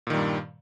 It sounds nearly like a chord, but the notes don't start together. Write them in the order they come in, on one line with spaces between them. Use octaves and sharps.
A#2 D#3 G3 G2